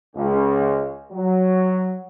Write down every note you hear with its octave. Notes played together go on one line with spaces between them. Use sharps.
C#2
F#3